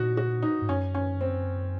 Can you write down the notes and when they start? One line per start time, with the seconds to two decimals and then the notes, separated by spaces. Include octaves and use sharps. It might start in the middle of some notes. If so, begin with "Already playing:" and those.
Already playing: A#2 D#4 F#4
0.17 F#4
0.42 D#4
0.62 G#2
0.69 F#2 C#4
0.95 C#4
1.21 C4